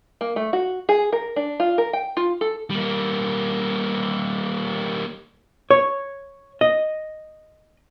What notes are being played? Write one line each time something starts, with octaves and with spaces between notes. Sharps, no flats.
A#3
A3
F#4
G#4
A#4
D4
F4
A#4
G5
F4
A4
G3 A#3
C#5
D#5